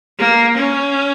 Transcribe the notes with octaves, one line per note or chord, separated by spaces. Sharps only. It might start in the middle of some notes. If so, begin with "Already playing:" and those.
A#3
C#4